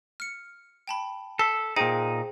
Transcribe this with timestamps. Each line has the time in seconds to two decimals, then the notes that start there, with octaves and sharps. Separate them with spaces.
0.20 F6 C#7
0.88 G5 A5 B5
1.39 A4 B6 C7 G7
1.76 A#2 D#4 G#4 C5 G5